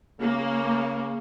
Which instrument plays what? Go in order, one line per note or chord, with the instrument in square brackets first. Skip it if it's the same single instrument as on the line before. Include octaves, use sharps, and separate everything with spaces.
[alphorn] C#3 [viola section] A#3